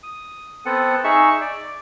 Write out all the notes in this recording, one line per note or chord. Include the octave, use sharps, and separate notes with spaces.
D#6
B3 C4 A4 F#5
D#4 G#4 E5 C#6
D5